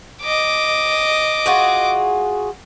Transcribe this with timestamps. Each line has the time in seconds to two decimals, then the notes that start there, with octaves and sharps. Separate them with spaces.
0.22 D#5 D6
1.46 F4 F#4 G#4